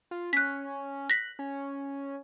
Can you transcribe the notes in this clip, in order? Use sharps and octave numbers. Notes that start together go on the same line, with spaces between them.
F4
C#4 F#6 B6
F#6 A#6 B6
C#4